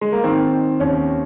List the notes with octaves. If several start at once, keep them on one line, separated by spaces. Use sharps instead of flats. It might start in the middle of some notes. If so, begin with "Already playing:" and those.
G#3
A#3
D#3 C4
D#3
D#2 C#4